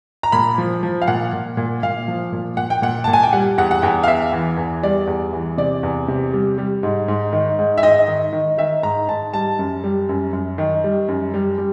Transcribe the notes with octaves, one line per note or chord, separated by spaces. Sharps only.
A#5
A#2 B5
F3
F3
F5
A#2 F#5
A#2
A#2
A#2 F5
F3
A#2
A#2 F#5
G5
A#2 F#5
A#2 A5
G#5
G5
G3 F#5
E2 F#5
F#5
E2 G5
F5
E2 E5
E3
E2
G3 D5
E2
E3
C3 D5
E2
C3
G3
G3
G#2
G#2
D#3
G#2
E5
G#2 D#5
D#3
D#3
D#3 E5
G#2 A#5
G#2 A5
G3 A5
F#2
G3
F#2
F#2
D#3
G3
F#2
G3
G3